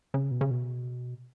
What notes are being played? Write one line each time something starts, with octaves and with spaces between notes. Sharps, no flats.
C#3
B2
C#3
B2